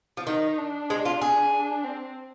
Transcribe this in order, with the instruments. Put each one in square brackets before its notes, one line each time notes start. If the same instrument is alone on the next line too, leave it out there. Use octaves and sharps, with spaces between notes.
[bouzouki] F3
[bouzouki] D#3 [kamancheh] D#4
[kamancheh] D4
[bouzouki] G#3
F4
G#4
[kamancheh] D4
C4